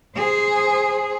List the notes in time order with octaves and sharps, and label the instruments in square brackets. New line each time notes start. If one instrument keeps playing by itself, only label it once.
[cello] G#4 C5